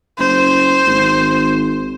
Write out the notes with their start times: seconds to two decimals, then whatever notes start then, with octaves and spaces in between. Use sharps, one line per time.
0.18 F#1 C5
0.87 G#1